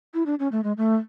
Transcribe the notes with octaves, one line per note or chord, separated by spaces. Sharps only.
E4
D4
C#4
A3
G#3
A3